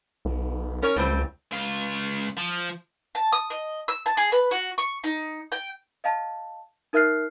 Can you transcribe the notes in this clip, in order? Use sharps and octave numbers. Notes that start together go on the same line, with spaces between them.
B1
C#4 A#4 C#5
C#2 A2 G3 C4
C#2 F4
F3
A5
D#6
D#5
E6
A5
G#4
B4
F#4
C#6
D#4
G5
D#5 F5 A5
D#4 A#4 E5 F6 F#6 C7